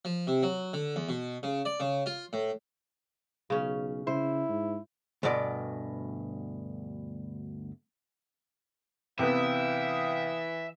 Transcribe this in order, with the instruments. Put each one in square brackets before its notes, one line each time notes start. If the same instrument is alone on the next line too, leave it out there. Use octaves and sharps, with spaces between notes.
[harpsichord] F3
C3
F#3
D3
E2
B2
C#3
D5
C#3
F4
A2
[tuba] B1 [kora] C#3 C#4
[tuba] C#3 [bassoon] E4 [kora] C5
[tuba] G#2
[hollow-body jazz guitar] D2 G2 B2 D5
[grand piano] C3 B3 [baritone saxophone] E3 [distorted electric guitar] E5 [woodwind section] F5 G5 D#6